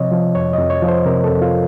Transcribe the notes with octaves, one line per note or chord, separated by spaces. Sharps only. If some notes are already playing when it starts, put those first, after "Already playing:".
Already playing: C3 F3 C#5 D#5
F3
F2 C#5
D#5
F2
C#5
F3
C5
C3 A#4
A4
F2
F4